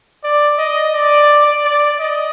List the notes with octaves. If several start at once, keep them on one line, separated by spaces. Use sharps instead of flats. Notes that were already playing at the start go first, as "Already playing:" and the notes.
D5
D#5
D5
D5
D#5